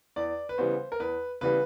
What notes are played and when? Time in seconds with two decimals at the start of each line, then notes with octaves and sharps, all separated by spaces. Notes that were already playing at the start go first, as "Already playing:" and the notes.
0.16 E2 D5
0.49 B4
0.58 C#3 E3 G3 B3 C5
0.92 A#4
1.00 E2 B4
1.41 C#3 E3 G3 B3 B4